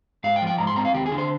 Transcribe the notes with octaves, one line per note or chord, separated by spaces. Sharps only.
G#2 F5
G5
F3
G5
G#2 A#5
C6
C4 A#5
F5
D#2 G4
G#4
D3
C5